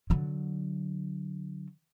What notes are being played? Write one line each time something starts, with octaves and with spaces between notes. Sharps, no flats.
D3 F#3